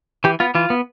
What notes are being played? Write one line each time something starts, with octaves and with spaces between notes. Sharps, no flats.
E3 G4
B3 F4
E3 F4
B3